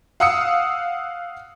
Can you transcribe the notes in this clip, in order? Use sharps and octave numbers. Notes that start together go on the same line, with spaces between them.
F5 F#5 D#6 E6 C#7